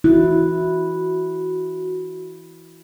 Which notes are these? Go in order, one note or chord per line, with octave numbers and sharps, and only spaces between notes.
E4 F#4